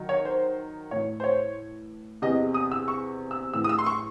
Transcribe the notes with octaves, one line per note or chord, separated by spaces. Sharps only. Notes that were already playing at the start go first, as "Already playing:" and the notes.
Already playing: D#3 F#3
C#5
C5
A2 E3 C#5
C5
C#5
E2 C3 E3 D#5
D#6
E6
C#6
E6
A2 E3 E6
D#6
E6
C6
C#6